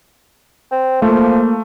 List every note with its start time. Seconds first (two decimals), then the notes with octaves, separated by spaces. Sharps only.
0.72 C4
1.02 F3 A3 A#3